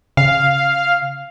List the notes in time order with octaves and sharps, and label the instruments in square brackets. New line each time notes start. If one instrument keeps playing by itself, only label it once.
[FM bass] C#3 [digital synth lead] F5